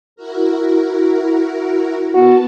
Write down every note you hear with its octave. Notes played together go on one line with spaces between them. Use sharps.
E4 F#4 A#4
B3 F#4 A5